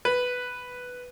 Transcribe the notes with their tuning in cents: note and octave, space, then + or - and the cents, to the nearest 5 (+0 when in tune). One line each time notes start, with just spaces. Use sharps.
B4 +0